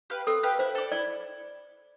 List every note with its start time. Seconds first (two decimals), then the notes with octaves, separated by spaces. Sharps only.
0.10 G4 B4 F5
0.27 C4 A4
0.43 G4 B4 F5
0.59 E4 C5
0.75 A4 D5
0.92 E4 D5